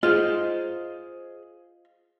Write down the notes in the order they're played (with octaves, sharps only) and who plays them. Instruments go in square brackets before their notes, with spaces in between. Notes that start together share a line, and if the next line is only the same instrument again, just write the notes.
[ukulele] F4 [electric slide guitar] G#4 C5 D#5